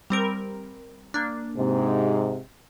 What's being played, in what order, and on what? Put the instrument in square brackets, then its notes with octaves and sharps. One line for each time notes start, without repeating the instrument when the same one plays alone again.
[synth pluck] G3 C4 A#4
A#3 D4
[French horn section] G#2 C3